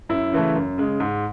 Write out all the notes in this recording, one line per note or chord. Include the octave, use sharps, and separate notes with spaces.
F#2 E4
C#3 E3 A3
F#2
C#3 G#3
G#2